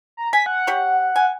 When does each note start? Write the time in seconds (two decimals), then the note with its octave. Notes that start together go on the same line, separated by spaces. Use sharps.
0.17 A#5
0.33 G#5 B6
0.46 F#5
0.67 G4 C#5
1.16 G#5